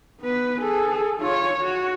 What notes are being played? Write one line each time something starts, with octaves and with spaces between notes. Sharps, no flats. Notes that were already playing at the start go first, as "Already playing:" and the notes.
B3 B4
G#4 A4
F4 C#5
F#4